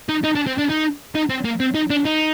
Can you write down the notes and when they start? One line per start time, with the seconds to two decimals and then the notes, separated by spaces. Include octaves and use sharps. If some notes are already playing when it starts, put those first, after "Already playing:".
0.09 D#4
0.24 D#4
0.35 D4
0.47 C4
0.58 D4
0.69 D#4
1.15 D#4
1.30 C4
1.45 A#3
1.60 C4
1.75 D#4
1.90 D4
2.05 D#4